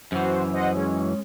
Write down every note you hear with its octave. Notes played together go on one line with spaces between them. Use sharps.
F#2 E3 F#4 C5
C5 D#5 F#5
G#3 C#4